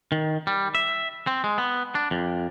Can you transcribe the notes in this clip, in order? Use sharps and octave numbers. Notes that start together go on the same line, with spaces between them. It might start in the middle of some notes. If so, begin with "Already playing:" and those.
D#3
G3
E5
C4
G#3
B3
D4
F2